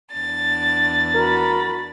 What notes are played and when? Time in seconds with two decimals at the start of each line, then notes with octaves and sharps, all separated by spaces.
0.11 E2 D4 A6
1.15 F#4 A#4 B5